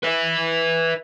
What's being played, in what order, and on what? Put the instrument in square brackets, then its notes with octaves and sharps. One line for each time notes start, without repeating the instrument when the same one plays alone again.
[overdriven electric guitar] B4 E5